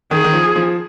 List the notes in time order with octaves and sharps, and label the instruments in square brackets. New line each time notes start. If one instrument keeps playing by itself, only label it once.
[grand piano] D#3 [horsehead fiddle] G#4
[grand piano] D#3
F3
F3